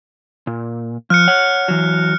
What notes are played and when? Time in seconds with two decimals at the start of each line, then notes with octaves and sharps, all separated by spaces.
0.47 A#2
1.10 F3 F6 F#6 C#7
1.28 C#5 F#5
1.68 E3 F#3